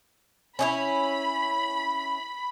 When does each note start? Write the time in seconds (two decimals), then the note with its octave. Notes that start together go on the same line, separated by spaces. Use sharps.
0.59 C#4 D#4 E4 B5